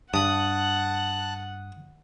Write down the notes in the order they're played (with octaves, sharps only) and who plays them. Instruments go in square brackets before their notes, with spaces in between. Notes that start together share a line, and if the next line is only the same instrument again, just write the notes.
[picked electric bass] G2 [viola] F#5 [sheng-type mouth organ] A5 F#6 [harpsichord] D#6